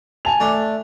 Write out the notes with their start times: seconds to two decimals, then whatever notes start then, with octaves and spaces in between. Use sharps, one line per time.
0.25 G#5 A5 F7
0.40 A3 D4